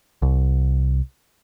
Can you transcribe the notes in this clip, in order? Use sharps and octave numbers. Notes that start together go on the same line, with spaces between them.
C2